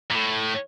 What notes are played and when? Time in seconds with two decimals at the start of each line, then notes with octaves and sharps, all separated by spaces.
0.11 A#2
0.15 A2